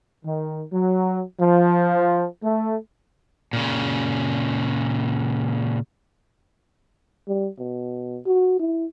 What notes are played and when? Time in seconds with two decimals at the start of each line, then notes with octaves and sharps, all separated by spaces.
0.24 D#3
0.71 F#3
1.39 F3
2.43 A3
3.53 A#2 C#3
7.28 G3
7.59 B2
8.26 F#4
8.60 E4